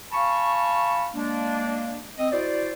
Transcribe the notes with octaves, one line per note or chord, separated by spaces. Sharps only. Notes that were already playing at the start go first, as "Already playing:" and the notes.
F5 G#5 A5 B5 C#6
G#3 A#3 D4
C4 D#5
E4 F#4 C5 D5